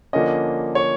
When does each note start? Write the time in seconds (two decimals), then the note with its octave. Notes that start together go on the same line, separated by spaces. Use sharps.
0.13 D3 F3 A#3 C#4 D#5
0.75 C#5